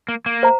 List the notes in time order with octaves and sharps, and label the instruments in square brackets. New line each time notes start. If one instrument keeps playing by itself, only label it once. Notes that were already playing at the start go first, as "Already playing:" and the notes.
[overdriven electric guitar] A#3
A#3
[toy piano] C5 F5 A#5